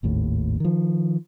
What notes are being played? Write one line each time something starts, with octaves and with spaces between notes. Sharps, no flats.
G#1 D#2 A2
D#3 F3